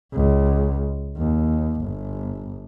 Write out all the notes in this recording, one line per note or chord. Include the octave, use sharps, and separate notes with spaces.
C#2
D#2
G1